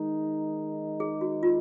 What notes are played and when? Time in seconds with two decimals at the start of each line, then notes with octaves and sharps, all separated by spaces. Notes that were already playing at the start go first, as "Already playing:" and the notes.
Already playing: D#3 G#3 D#4
1.00 G#4
1.21 F#4
1.43 F4